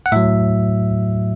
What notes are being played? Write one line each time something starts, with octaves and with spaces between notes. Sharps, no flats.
F#5
A2 F#3 E5